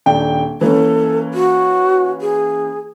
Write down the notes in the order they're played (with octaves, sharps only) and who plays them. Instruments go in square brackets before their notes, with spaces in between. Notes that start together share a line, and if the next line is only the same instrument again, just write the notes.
[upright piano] D#1 D4 G5
[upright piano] E3 A#3 C#4 [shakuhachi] A4
[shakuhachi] F#4
G#4